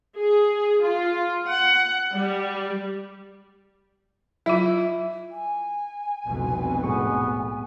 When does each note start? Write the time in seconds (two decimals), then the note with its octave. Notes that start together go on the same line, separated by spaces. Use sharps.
0.18 G#4
0.83 F4
1.48 F#5
2.13 G3
4.46 F#3 E4 F4
5.31 G#5
6.26 F1 C2 B2
6.84 A2 G#3 B3 C#6